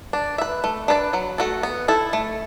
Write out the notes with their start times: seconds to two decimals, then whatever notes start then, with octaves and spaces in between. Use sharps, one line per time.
0.13 D4
0.38 B4 E5
0.64 A3
0.88 D4 B4 D5
1.13 F#3
1.38 A3 F#4 A4
1.63 B3
1.88 E4 A4
2.13 A3